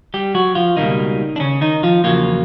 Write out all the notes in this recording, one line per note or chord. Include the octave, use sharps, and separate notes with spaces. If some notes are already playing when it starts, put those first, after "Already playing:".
G3 G4
F#3 F#4
F3 F4
C#2 B2 D#3 G3 A#3 D#4
D4
C#3 C#4
D#3 D#4
F3 F4
E2 C#3 F3 F#3 A#3 F4